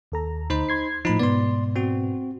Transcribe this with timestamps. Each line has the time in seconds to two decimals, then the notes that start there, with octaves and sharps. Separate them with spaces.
0.12 D#2 A4 A#5
0.50 D2 D#4 C5 B5
0.69 C6 G#6 C7
1.05 A2 F3 D#4 B5
1.19 G#2 B2 B3 D5 C6
1.76 C4 F#4